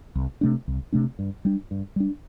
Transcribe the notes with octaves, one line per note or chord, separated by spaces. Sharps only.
C2
C3 A3 D4
C2
C3 A3 D4
G2
G3 D4
G2
G3 D4